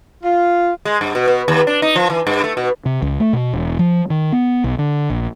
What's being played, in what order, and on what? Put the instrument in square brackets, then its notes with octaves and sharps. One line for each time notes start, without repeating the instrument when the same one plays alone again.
[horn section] F4
[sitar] G#3
G2
B2
B2
D#2
D4
D#4
F3
E3
G2
A3
B2
[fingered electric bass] C3
C#2
A3
B2
E1
F3
D#3
B3
B1
D3
A#1